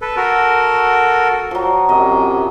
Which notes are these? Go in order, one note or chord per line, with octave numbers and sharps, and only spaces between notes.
A4 B4
F#4 A4 A#4
F3 F#3
F#2 C3 D#5